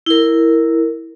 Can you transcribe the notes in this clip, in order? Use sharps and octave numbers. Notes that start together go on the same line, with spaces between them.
E4 A#4